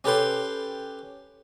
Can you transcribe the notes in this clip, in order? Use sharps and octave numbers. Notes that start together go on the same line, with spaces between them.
C#4 G4 A4 B4 G5 C6